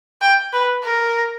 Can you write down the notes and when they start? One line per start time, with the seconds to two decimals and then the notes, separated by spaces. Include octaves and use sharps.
0.21 G5
0.53 B4
0.84 A#4